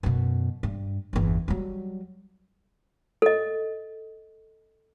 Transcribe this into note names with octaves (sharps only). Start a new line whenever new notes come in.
F#2 B2
G2
G1 E2
F#3 G3
A4 D#5